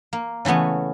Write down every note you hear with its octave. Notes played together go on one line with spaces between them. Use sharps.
A#3
C#3 E3 A3 B3 C#4